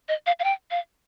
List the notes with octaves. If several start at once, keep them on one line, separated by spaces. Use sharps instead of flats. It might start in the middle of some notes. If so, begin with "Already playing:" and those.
D#5
F5
F5
G5
F5